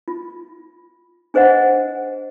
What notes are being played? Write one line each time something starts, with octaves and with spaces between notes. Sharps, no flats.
F4
D4 G#4 C5 D#5 F#5